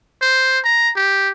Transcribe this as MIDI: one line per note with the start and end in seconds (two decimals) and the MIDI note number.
0.22 0.60 72
0.65 0.91 82
0.96 1.31 67